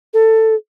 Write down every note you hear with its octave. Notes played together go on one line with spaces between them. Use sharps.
A4